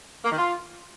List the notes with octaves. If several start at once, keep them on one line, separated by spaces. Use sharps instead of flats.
A#3
D#3
F4